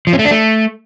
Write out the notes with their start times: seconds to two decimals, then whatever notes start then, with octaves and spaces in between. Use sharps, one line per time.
0.07 F3
0.13 C#4
0.19 A3
0.25 D4
0.31 A3